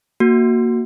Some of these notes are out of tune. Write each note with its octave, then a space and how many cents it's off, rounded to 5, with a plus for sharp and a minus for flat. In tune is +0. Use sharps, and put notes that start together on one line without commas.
A#3 +0 F#4 -5